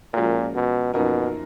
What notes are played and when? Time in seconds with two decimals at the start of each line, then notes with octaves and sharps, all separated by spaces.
0.13 A#2 F3 G#3 C#4 F#4 A#4
0.55 B2
0.94 F#2 B2 F3 A#3 D#4 A#4